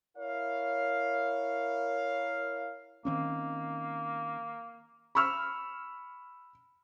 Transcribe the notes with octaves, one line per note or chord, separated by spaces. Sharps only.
E4 A#4 C#5 F5
D#3 A#3 C4 C#4
B5 C#6 E6 F6